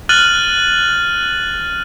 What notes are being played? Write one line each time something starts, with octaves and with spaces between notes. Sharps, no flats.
F6 F#6 A6 D#7 F#7